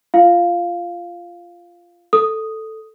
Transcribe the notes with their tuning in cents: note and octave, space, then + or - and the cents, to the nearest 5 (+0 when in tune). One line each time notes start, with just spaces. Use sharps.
F4 -15 F5 +0
A4 +0 D#6 +0